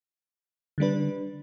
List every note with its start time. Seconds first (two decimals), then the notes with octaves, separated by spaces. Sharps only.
0.78 D3 G3 D4 B4